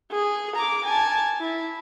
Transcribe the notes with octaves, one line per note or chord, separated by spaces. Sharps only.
G#4
A#5 D6
G#5 A5
E4